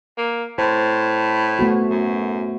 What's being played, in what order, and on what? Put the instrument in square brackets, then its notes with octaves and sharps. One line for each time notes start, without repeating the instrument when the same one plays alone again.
[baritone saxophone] A#3
[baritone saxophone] A2 [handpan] C5
[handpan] A3 B3 F#4
[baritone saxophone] F#2